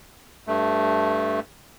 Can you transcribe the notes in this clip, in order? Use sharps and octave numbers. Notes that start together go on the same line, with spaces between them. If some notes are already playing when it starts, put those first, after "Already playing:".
G2 A3